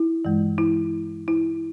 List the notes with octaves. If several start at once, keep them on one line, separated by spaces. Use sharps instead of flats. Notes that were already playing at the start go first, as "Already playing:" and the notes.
Already playing: E4
G2 E3 G#3
E4
E4